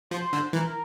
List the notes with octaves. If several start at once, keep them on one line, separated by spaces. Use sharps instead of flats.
F3 C5
D3
E3 A#4